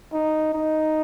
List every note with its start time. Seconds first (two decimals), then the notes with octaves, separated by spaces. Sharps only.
0.13 D#4
0.53 D#4